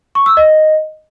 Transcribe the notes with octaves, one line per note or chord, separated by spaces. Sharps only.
C#6
E6
D#5